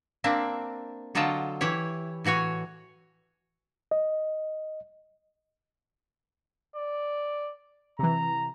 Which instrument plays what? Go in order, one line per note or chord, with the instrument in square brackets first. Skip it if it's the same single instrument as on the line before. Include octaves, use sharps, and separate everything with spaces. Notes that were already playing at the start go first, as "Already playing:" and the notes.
[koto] A#3 C4 D4 E5
D3 F#3 F4 D#5 G5 A5
E3 E4 G4 C#5
A2 E3 F#4 C#5 G#5
[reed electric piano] D#5
[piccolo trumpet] D5
[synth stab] C3 E3 [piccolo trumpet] A#5